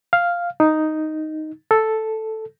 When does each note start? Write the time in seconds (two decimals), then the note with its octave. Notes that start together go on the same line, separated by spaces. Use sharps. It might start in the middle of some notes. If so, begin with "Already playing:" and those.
0.13 F5
0.60 D#4
1.71 A4